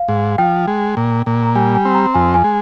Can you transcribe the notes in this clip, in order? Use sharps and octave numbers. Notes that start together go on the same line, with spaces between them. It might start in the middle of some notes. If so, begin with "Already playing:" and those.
Already playing: F5
G#2
F3 G5
G#3
A#2
A#2
A#5
G3 G#5
G#5
C4
A#5
F2 G#5
G#5
G#3